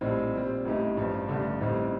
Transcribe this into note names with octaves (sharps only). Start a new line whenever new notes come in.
A#1 A2 G3 C4 D#4
A#2 G3 C4
A1 A2 A3 D#4 G4
A1 G2 F3
A1 G2 D3 A3 D4
A1 A2 G3 C4 D#4